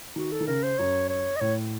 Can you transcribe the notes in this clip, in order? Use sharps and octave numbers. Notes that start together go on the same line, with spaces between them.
D#3 F#4
A4
D#3
C#3 A#4
C5
F#2 C#5
C#5
D#5
A2 C#5